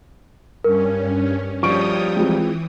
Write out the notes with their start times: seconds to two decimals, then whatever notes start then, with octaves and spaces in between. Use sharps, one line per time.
0.64 G2 C#4 A#4
1.63 F3 G3 C#5 G5 C#6 D#6 D7
2.17 E3 G#3 C4 F4